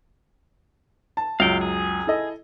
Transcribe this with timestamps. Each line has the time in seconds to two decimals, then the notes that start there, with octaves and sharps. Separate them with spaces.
1.17 A5
1.40 C#2 F#2 F5 G5
1.61 G#4
2.07 E4 A4 D#5